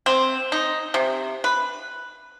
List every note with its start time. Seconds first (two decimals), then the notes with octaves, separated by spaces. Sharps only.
0.06 C4
0.52 D#4
0.94 C3
1.44 B4